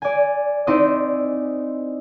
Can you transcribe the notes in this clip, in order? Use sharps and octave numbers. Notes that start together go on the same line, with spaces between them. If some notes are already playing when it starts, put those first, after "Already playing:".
D5 G#5
C4 D#4 E4 C5 D5 D#5